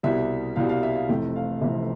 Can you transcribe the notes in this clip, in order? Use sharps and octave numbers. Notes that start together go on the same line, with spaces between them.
C2 B2 G3 E5
C2 B2 G3 F5
F5
E5
F5
F1 F2 C3 E3 A3 G5
F5
F1 F2 C3 E3 A3 E5